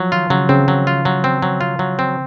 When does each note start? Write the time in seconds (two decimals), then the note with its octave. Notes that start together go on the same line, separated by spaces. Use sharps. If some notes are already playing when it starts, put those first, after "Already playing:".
Already playing: F3 F#3
0.12 D#3 F4
0.30 C#3 F#3
0.49 C#3 C4
0.68 F#3
0.87 F4
1.05 F#3
1.24 C4
1.42 F#3
1.61 F4
1.79 F#3
1.99 C4